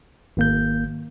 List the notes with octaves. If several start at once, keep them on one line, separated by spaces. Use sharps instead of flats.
G#1 A#3 G6